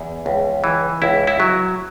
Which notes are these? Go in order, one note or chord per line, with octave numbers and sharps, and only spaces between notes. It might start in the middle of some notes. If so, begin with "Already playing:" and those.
Already playing: E2
C#2
E3
C#2 E4
E4
F#3